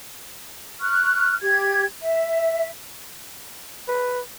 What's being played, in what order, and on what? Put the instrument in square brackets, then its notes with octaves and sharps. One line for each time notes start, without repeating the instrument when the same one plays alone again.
[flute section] C#6 F6 F#6
G4 G#6
E5
[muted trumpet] B4